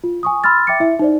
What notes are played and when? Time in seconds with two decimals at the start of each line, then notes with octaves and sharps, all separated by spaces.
0.04 F4
0.23 G#5 C#6 D#6
0.44 B5 C6 E6 F6 A6
0.67 E5 G5 D6 A6 C#7
0.80 E4 E5
0.99 D#4 C5 D5